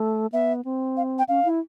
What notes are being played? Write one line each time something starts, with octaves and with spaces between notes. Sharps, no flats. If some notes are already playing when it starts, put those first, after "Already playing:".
Already playing: A3
B3 E5
C4
F5
G5
C#4 F5
E4